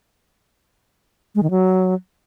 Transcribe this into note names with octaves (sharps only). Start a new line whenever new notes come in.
G#3
D#3
F#3